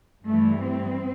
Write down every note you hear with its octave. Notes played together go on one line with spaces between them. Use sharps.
G2 E3 G3 A3
C4